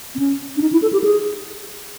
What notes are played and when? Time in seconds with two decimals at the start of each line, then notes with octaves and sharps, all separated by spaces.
0.15 C4
0.19 C#4
0.57 D4
0.62 D#4
0.73 E4
0.82 A4
0.93 G4
1.04 G#4